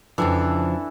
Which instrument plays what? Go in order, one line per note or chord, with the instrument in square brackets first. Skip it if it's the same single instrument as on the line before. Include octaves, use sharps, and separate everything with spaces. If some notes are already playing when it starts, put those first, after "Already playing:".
[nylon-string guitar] F2 C#3 F3 [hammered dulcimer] E3 D4 A4